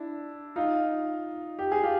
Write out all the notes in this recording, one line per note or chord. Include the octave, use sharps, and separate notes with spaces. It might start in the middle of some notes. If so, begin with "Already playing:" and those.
Already playing: D4 E4
D#4 F4
G4
G#4
F4 G4